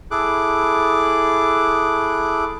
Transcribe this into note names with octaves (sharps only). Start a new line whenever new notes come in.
E4 G#4 A4 D6 F#6